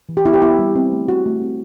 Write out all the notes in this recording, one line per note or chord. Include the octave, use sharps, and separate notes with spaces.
E3
G4
B3 E4
G4
B3 E4
G3
C4
A3
C4 F#4
A3
C4